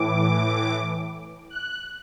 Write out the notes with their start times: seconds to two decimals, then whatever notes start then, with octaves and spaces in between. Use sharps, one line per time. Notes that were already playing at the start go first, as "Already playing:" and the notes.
Already playing: A2 E3 D6
1.50 F#6